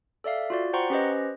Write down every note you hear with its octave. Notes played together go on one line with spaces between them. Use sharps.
A4 D5 E5 F5
F4 F#4 D5
C5 F#5 G5 A#5 C6 C#6
C#4 G4 B4 C5 D#5